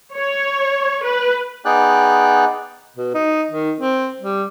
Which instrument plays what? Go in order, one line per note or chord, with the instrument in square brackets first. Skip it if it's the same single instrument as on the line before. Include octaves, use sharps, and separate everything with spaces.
[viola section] C#5
B4
[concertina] B3 D#4 G#4 D5 G5 F#6
[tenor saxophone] B2
D#4
D#3
C4
G3